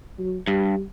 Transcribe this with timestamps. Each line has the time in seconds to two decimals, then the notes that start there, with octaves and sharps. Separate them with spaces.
0.19 F#3
0.47 G2 G3